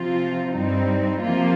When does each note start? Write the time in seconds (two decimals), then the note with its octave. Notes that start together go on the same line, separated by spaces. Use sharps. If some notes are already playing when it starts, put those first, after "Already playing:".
Already playing: C3 F3 C4 F4
0.56 G2 G3 C4 D#4
1.22 C3 F3 A#3 F4